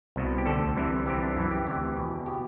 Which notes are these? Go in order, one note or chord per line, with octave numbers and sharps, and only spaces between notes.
C2 B2
G4
D2 D3 A4
C2 C3 E3
C2 C3 E3 G4
D4
F#2 E3 E4
G4
D2 C3 E3 G4
E2 B2
B2 G4